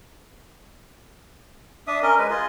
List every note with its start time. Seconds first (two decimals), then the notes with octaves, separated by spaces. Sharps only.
1.87 D4 E5 D#6
2.02 C#4 A#4 D#5
2.18 G#3 B4
2.30 F4 G#4 D#5